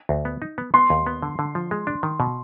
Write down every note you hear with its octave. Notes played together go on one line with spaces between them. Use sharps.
D2
B3
D#4
B3
B3 C6
D#2
B3
D3
D3
F3
G#3
D4
D#3
B2